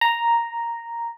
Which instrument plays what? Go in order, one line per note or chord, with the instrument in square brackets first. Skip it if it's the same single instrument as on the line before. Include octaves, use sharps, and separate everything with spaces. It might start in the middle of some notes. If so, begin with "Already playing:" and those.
[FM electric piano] A#5